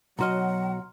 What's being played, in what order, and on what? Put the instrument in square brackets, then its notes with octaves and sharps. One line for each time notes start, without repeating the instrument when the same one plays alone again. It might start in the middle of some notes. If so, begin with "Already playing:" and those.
[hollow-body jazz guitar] B1 F#4 D#5 [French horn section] F#3 [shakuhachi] F#5 [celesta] A#5 C6 F6